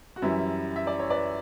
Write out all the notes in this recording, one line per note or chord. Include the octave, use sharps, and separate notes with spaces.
F#4
F#2 E3 G3 C#4 E4
E5
D5
C#5
B4 D5